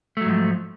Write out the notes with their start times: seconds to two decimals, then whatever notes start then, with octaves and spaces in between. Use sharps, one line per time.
0.17 A3
0.21 F#3
0.25 G#2
0.30 F3